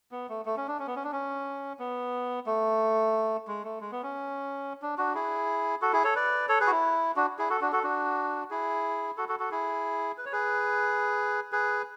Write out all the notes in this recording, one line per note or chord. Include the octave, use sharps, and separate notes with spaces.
B3
A3
A3
C#4
D4
C#4
B3
C#4
D4
C#4
B3
A3
G#3
A3
G#3
B3
C#4
D4
D4 F#4
E4 G#4
F#4 A4
E4 G#4
A4 C#5
B4 D5
A4 C#5
G#4 B4
F#4
E4
D4 F#4
E4 G#4
F#4 A4
D4 F#4
F#4 A4
D4 F#4
E4 G#4
F#4 A4
F#4 A4
F#4 A4
E4 G#4
B4
C#5
G#4 B4
G#4 B4